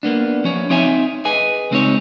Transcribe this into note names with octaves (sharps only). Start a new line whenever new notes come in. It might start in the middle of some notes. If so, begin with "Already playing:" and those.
A#3 B3 D4
F3 C#4 C#5
C4 D#4 C#5 E5 G#5
G#4 B4 D#5 G#5
C#2 G#3 C4 D4 D#4 C#5